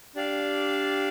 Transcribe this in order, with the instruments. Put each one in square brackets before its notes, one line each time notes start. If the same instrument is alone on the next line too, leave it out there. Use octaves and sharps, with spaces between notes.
[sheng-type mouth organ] D4 G4 D5 F5